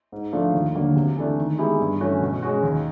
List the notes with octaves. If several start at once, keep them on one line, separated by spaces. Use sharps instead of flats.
G#2
F3 A3 D4 F4
D#2
D3 F#3 A#3
C3
E3 A3 D4
D#3
G#3 B3 E4 G4
G2
E3 A3 C#4 F#4
B2
G#3 C#4 F#4
D#2